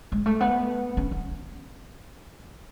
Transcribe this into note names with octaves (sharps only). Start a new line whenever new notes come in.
G#3
A3
B3
C#4
C#4